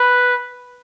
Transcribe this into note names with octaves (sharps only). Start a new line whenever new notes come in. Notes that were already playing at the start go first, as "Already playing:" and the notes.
Already playing: B4